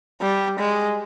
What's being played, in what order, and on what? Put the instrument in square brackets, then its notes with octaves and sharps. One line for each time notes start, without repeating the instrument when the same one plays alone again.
[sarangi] G3
G#3